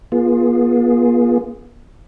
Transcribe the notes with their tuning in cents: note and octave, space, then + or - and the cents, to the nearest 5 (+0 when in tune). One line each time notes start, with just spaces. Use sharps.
B3 -45 F4 +0 G#4 +0